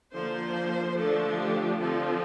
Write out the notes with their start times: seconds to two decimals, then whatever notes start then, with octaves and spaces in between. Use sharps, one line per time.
0.15 D3 F3 A#3 C5
0.97 D3 F3 A3 D4 A4
1.37 G4
1.78 D3 F3 C4 A4